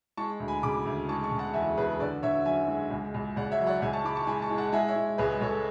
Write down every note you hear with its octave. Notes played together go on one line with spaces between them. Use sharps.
G#3 A5 C#6
D2
G#5 B5
C#3 B5 D6
D2
G#3 A5 C#6
A5 C#6
C#3
F#5 A5
E2 E5 G#5
E2 G#4 B4
D3 B4 D5
D3 C#5 E5
F#2 E5 G#5
G#3
C#2
C#2
C#2 D5 F#5
C#5 E5
F#3
D5 F#5
C#2 E5 G#5
A5 C#6
G#3 B5 D6
A5 C#6
G#3 G#5 B5
A5 C#6
G#3
F#5 A5
G#3 E5 G#5
C#5 E5
G#3
C#2 G#4 B4
C#2 A4 C#5